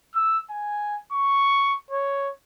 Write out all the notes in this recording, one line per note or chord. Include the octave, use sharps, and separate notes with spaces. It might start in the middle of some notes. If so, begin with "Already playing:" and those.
E6
G#5
C#6
C#5